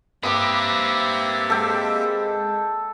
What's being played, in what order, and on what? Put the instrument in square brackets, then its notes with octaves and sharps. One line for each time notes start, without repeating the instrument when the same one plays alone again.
[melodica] A#3 C4 E5 [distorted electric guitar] G4 B4 [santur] D6 D#6
[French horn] G#3 [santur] A4 G5